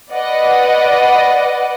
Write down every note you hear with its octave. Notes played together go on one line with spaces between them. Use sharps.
B4 D5 D#5 F#5